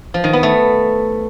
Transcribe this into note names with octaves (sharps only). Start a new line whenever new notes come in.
F3
D#3
B3
A3